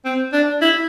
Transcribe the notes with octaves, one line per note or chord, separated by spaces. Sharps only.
C4
D4
E4